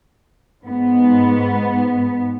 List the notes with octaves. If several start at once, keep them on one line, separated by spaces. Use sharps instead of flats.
G#2 B3